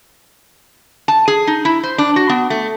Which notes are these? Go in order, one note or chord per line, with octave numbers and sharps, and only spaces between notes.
A5
G#4
D#4
E4
C5
D4
F#4
B3
A3